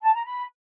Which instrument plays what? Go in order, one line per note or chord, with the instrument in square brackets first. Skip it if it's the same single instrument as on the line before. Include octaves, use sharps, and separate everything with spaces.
[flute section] A5
A#5
B5